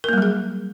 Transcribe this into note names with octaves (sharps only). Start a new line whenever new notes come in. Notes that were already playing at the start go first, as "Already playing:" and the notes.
F#3 G3 A#3 G#4 A#4